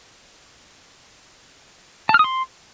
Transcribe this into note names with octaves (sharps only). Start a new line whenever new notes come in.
A5
F6
D#6
C6